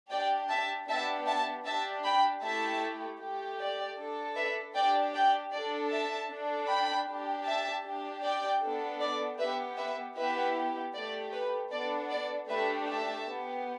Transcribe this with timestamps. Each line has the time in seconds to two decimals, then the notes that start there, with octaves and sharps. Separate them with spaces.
0.10 D4 G4 D5 G5
0.49 E5 A5
0.88 B3 D4 G4 E5 A5
1.27 E5 A5
1.65 D4 G4 E5 A5
2.04 G5 B5
2.42 A3 E4 G4 E5 A5
3.20 A3 G4
3.60 D5
3.98 D4 A4
4.36 B4 E5
4.75 D4 G4 D5 G5
5.14 D5 G5
5.52 D4 A4 D5
5.91 E5 A5
6.30 D4 A4
6.68 G5 B5
7.07 D4 G4
7.46 E5 A5
7.84 D4 G4
8.23 D5 G5
8.62 B3 D4 A4
9.00 D5
9.39 B3 G4 B4 E5
9.78 B4 E5
10.16 B3 E4 G4 B4 E5
10.94 A3 G4 D5
11.33 B4
11.71 B3 D4 A4 D5
12.10 D5
12.49 A3 D4 G4 B4 E5
12.88 E5 A5
13.26 B3 G4